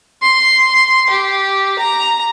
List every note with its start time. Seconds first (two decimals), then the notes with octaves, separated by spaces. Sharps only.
0.22 C6
1.09 G4
1.79 A#5